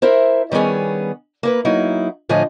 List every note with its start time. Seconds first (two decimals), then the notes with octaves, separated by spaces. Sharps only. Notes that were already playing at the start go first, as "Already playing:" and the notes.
0.02 E4 A#4 C5 E5
0.51 D#3 G3 B3 C#4 G#4
1.43 A#3 E4 B4
1.65 F#3 A#3 D#4 E4
2.29 A2 D3 F3 F4 D#5 G#5